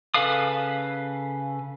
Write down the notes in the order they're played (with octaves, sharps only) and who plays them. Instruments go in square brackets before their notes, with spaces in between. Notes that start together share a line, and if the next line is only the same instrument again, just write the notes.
[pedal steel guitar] C#3 A4 B4 F5 D#6